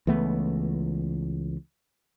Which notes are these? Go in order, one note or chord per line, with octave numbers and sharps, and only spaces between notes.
C#2 E3 A3 B3